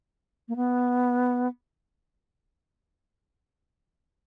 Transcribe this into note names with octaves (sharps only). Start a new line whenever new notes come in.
A#3
B3